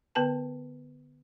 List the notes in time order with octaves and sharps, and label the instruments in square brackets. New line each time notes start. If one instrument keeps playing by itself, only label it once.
[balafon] D3 B3 B4 A5